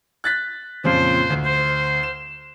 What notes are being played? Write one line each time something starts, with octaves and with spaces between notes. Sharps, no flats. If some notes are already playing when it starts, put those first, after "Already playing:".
F#6 A6 B6
F2 A#2 C#3 C5
D2
C5
E7